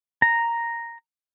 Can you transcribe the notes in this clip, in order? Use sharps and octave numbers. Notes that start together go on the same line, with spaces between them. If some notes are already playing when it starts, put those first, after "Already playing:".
A#5